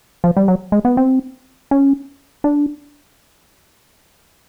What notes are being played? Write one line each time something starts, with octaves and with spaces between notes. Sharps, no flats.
F3
G3
F#3
G#3
B3
C4
C#4
D4